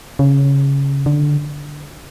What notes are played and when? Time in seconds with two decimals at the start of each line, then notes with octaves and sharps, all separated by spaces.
0.19 C#3
1.06 D3